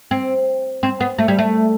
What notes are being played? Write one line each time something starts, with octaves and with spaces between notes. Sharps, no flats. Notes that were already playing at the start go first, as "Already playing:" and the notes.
C4
C4
B3
A3
G3
A3